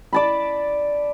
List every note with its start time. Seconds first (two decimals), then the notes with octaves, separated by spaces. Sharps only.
0.13 D5 A5 B5